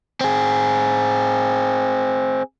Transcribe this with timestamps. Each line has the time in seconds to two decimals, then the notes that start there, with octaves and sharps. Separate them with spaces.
0.21 C4 G#4